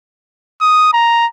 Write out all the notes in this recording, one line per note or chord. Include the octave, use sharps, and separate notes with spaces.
D#6
A#5